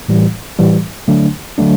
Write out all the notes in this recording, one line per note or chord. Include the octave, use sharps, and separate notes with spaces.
A2 E3 G3
A2 E3 G3
D3 F#3 A3 D4
D3 F#3 A3 D4